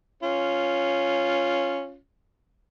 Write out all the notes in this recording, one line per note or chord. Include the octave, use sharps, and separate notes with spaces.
C#4 F4